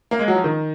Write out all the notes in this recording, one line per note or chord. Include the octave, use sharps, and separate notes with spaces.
A#3
G#3
F#3
F3
D#3